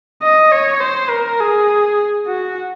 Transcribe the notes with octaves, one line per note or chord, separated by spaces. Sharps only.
D#5
C#5
C5
A#4
G#4
F#4